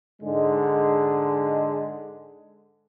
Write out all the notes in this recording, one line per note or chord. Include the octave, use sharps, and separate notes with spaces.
G#2 D3 G#3